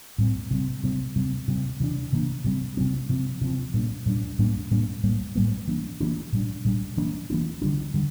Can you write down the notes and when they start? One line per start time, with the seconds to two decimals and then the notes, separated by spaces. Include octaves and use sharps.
0.18 A2 G3 C4
0.51 C3 G3 C4
0.83 C3 G3 C4
1.16 C3 G3 C4
1.48 C3 G3 C4
1.80 C3 E3 A#3 D4
2.12 C3 E3 A#3 D4
2.44 C3 G3 C4
2.77 C3 G3 C4
3.09 C3 F3 C4
3.41 C3 F3 C4
3.74 A#2 G3 A#3 D4
4.06 A#2 G3 A#3 D4
4.39 A2 G3 A#3 D4
4.71 A2 G3 A#3 D4
5.03 A2 G3 A#3
5.35 A2 G3 A#3
5.67 E3 A#3 D4
6.00 E3 A#3 D4
6.33 A#2 G3 D4
6.65 A#2 G3 D4
6.97 E3 A#3 D4
7.30 E3 A#3 D4
7.62 D3 G3 D4
7.94 D3 G3